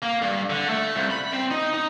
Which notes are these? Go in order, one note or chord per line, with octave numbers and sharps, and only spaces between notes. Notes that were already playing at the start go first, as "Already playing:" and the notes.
A#3
G2
D3
A3
C2
B5
C4
D#4
D#4